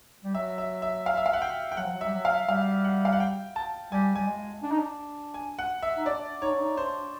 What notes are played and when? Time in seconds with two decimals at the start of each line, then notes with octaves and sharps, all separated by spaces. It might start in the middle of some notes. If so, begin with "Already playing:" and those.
0.24 G3
0.35 F#3 E5
0.58 E5
0.82 E5
1.06 F5
1.17 E5
1.26 F5
1.33 F#5
1.42 G5
1.72 G5
1.77 F#3 F#5
1.85 F3
1.92 F#3
2.01 G3 E5
2.13 F#3
2.25 F5
2.49 G3 F5
2.85 F#5
3.05 F5
3.13 F#5
3.20 G5
3.56 A5
3.92 G3 G#5
4.15 G3 G#5
4.27 G#3
4.63 D4
4.71 D#4
4.79 D4
5.34 G#5
5.59 F#5
5.82 E5
5.97 D#4
6.06 D4 D5
6.41 D#4 C#5
6.51 D4
6.60 D#4
6.77 D4 C5